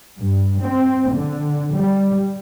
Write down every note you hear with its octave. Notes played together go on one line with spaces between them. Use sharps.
G2
C4
D3
G3